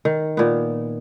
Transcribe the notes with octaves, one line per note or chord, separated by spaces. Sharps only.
D#3
A#2 B3